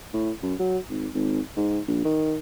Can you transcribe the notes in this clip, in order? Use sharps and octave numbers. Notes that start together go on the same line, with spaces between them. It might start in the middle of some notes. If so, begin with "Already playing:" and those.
A2
F#2
F#3
G#1
G#1
G#2
A#1
D#3